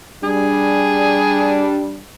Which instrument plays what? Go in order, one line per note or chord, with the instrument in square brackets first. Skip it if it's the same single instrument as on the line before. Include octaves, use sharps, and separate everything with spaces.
[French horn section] G3 D4 [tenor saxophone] G#4